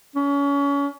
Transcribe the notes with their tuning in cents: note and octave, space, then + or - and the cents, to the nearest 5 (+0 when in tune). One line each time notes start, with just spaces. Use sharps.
C#4 +30